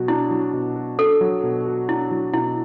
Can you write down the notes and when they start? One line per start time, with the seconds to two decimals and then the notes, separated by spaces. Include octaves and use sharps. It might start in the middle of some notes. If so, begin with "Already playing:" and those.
Already playing: B2 F#3 F#4
0.08 D4 E4
0.31 F#3
0.53 B2
0.76 F#4
0.99 D4 A4
1.21 F#3
1.43 B2
1.66 F#4
1.89 D4 E4
2.11 F#3
2.33 B2 E4